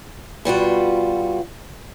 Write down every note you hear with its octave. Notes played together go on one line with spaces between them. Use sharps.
B2 G3 F4 F#4